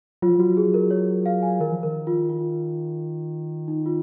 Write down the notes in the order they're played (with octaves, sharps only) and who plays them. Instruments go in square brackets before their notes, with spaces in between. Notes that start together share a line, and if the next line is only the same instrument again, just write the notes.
[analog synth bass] F#3 [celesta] F4
[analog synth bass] F3
[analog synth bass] F#3 [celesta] F#4
[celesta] G#4
A#4
C#5
F5
G#5
[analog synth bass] D#3 [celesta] A#4
[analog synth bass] F3
[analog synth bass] D#3 [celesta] A#4
[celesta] F4
F4
D#4
F4